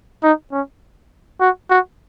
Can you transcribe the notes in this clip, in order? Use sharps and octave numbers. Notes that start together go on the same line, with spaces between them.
D#4
C#4
F#4
F#4